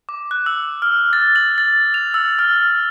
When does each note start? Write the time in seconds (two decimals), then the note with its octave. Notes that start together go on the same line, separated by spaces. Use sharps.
0.09 D6
0.31 F#6
0.46 E6
0.82 F6
1.13 A6
1.36 F#7
1.58 A6
1.94 F7
2.14 E6
2.39 F6